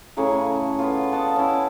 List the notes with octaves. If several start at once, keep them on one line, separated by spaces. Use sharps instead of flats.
A2 C#3 C#5 A#5
B3 F4
D5 D#5 F#5 A5
C#4 E4